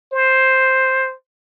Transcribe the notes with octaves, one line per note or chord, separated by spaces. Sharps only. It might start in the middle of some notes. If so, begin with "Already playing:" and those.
C5